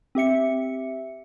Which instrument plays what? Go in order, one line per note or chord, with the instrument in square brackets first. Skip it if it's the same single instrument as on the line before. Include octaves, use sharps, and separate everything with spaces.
[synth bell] C4 G4 E5 C#7